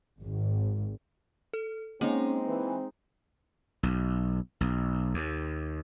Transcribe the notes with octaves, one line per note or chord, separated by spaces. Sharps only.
G#1
A4
G#3 A#3 C4 C#4 D#4
E3
B1
B1
D#2